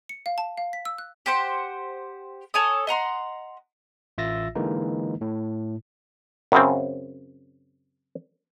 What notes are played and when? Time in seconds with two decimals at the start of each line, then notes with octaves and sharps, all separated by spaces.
0.09 C#7
0.26 F5
0.38 A5
0.58 F5
0.73 B6
0.85 E6
0.98 F#6
1.26 G4 C5 F#5
2.54 A4 C#5 G#5 D#6
2.87 D#5 F#5 A#5 C6
4.18 A1 F4 E5 E6 A6 A#6
4.55 D3 E3 G#3 A#3 D#4
5.21 A2
6.52 F#2 C#3 C4